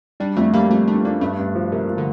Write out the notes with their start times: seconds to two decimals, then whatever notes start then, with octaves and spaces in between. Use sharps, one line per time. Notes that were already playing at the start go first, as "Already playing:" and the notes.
0.20 G3 D4
0.36 F2 A3
0.53 G3 A#3
0.71 F2 A3
0.88 A3 D4
1.05 A#3 D4
1.21 G2 A3
1.39 G2
1.55 F3
1.72 C3 A#3
1.89 F3
1.98 D3